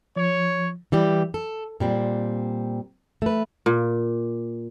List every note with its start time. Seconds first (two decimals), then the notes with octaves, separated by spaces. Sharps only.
0.16 F3 C#5
0.92 E3 G3 G4
1.34 A4
1.80 A#2 G3 C4
3.22 A3 B4
3.66 A#2